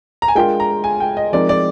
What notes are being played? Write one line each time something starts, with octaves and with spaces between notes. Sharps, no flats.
A#5
G#5
G#3 D4 F4 A#4 G5
A#5
G#5
G5
D#5
F3 G#3 C4 D#4 A#4 D5
D5